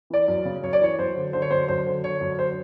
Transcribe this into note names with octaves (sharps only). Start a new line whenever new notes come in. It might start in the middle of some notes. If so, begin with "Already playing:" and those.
E3 D5
F#2
C#3
F#2 C#5
D5
E3 C#5
F#2 C5
D3
D3 C5
C#5
F#2 C5
F#2 C5
D3
D3 C#5
F#2
C5